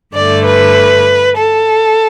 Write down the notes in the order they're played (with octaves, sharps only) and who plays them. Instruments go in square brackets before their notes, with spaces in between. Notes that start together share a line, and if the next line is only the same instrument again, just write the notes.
[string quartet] G2 D3 A3 D5
B4
A4